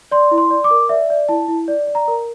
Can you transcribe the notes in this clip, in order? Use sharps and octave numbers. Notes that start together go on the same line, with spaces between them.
D5 C6
E4
C6
D5
D6
A#4
D5 E5
D5
E4 A5
E4
D5
D5
A#5
A#4